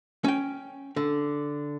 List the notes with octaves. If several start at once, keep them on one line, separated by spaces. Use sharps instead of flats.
C#4 G5
D3